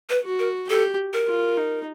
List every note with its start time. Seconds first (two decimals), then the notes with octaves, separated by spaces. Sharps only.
0.10 B4
0.24 F#4
0.39 A#4
0.69 G4 A4
1.13 A#4
1.27 F4
1.58 D#4